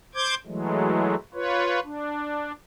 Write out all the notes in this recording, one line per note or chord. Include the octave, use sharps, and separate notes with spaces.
C5 D6 G6 G#6
E3 F#3 G#3 A3
F4 B4 C#5
D4